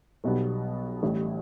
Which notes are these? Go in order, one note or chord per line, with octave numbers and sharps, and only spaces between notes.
B1 B2 G3 B3
A1 A2 G3